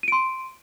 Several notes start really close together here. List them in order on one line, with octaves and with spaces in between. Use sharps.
D#7 D7 C6